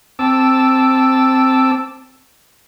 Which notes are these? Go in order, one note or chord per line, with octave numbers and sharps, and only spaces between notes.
C4 A5 D6 E6